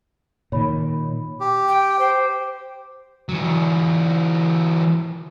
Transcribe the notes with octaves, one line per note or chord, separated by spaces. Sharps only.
A#2 D#3 C#5 B5
G4
G5
C5
E3 F#3